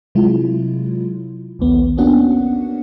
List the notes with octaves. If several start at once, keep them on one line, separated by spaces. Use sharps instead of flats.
C3 F#3 G#3 E4 F4
A#1 D#2 B3
A#3 B3 C#4 D4 F#4 F#5